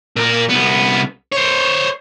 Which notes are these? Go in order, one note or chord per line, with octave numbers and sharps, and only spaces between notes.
A#2 A#4
C2 B3
C5 C#5